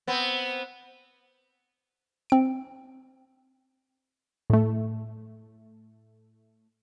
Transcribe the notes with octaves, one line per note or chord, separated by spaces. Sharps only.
B3 C4
C4 D7
A2 A3